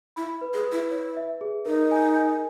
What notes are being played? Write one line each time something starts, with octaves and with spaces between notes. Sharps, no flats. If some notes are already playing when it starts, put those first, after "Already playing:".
E4 B5
B4
G#4
B4
E4
E4 C#5
E5
G#4
D#4 A#4
G#5
G#5